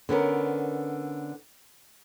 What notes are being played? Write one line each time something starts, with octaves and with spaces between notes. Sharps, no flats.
D3 B3 C#4 A#4